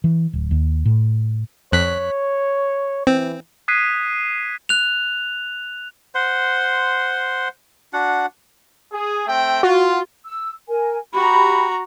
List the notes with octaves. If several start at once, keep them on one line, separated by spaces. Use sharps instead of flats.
E3
D1
D#2
A2
F2 C#5 F#6 B6
E3 C4
D#6 F#6 G#6 B6 C7 D#7
F#6 F7
C5 F#5 C6
D4 F#4 F#5
G#4
A3 C4 G5
F4 F#4
E6
A#4 G#5
F#4 G4 A#5 B5